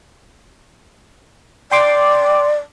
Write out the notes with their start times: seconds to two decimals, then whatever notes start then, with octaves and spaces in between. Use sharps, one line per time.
1.71 D5 G5 C6 D6